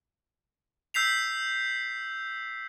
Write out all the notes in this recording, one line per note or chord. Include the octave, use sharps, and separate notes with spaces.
E6 G6 B6 C7 F7